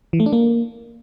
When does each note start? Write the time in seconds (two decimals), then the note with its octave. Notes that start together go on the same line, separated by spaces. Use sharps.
0.13 E3
0.20 A3
0.26 D4
0.33 A#3